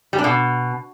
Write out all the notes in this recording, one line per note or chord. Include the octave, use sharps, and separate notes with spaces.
G3
D4
B2